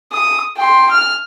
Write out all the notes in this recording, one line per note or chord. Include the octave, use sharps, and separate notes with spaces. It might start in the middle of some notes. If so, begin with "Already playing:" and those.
D#6
G5 C6
F6